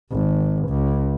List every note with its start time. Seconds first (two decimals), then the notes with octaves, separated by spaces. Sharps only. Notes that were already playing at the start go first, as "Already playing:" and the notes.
0.11 G#1
0.69 C#2